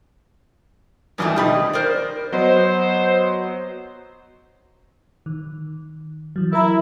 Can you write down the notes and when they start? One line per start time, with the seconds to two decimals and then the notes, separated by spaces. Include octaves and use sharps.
1.18 C2 G#2 D#3 E3 A3 D#6
1.36 B2 D#4 G4 B5
1.73 A#4 C5 D5
2.32 F#3 B3 C5 D#5
5.26 D#3
6.36 E3 F#3
6.53 E4 A#4 A#5